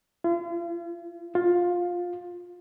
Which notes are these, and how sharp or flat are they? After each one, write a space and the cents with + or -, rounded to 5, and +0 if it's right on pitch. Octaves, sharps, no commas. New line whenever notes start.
F4 -40
F4 +15